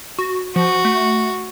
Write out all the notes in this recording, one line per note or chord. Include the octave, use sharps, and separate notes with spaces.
F#4
F3 F#4
A3